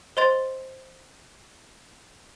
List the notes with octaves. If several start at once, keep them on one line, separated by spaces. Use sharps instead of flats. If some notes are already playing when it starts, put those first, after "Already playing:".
C5 D#5 C6 A6